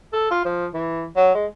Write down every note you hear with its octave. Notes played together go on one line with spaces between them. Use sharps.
A4
F4
F3
E3
F#3
G#3